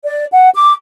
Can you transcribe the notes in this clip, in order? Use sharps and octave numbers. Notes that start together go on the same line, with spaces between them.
D5
F#5
D6